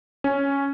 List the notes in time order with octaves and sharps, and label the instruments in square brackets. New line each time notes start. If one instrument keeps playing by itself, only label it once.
[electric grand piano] C#4